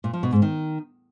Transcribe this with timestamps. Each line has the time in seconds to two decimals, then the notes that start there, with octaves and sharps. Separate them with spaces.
0.04 A#2
0.13 F3
0.23 B2
0.32 G#2
0.42 D#3